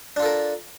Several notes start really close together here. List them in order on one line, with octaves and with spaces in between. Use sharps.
D4 F4 A4 A#4